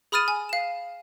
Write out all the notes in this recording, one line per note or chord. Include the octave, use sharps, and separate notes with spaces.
G#4 B5 D#6 F6 A6 D#7
G#5
F5 E7